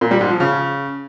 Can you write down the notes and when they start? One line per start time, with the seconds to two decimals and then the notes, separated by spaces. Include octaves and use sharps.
0.01 A#2
0.11 G3
0.21 G#2
0.30 F3
0.40 C#3